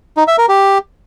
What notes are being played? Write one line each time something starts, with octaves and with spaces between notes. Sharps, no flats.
D#4
E5
A#4
G4